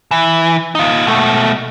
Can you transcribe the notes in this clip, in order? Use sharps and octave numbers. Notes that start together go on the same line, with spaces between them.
E3
D#4 F4
B2 A3